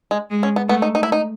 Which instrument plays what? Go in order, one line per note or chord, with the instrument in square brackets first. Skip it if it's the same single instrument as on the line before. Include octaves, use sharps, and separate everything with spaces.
[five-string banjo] G#3
[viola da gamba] G#3
[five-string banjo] C#4
B3
[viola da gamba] A3 [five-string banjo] B3
[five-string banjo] D#4
D#4
E4
D#4